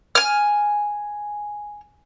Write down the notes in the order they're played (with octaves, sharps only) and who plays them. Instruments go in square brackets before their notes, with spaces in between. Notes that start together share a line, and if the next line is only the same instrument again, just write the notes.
[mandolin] G#5 F6